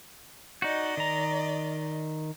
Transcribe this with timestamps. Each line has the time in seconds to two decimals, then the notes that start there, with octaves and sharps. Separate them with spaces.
0.62 D#4 F#4 D5 D#5
0.97 D#3 A#5